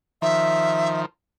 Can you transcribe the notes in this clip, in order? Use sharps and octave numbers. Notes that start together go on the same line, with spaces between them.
D#3 F3 E5